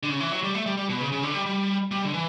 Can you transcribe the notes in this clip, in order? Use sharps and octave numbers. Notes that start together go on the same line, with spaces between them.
D3
C#3
E3
F#3
G3
A3
G3
G3
B2
C#3
C#3
D3
G3
G3
G3
D3
E3